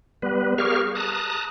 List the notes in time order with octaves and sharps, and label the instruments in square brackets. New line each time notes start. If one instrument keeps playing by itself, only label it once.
[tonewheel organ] G3 B3 B4
G4 G#4 A#4 F5 C#6 F6
A5 A#5 D#6 F#6